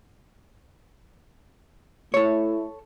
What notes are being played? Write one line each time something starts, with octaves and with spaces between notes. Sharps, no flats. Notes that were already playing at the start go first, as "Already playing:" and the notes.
A3 E4 A4 C#5